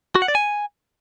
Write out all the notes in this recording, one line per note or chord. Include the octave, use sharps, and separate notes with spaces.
F#4
F#5
D5
G#5